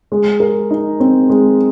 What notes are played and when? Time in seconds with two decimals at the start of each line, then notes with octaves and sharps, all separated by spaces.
0.12 G#3
0.40 A#4
0.71 D#4
1.00 C4
1.30 G#3